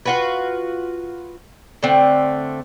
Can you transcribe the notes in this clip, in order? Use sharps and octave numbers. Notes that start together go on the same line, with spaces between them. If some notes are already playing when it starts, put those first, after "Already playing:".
F4 F#4 B4
D3 A3 C4